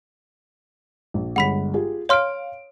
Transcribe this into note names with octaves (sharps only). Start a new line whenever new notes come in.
A#1
G1 G#3 F#5 B5 B6
F4 G4 G#4
C#5 F5 C6 F6 D7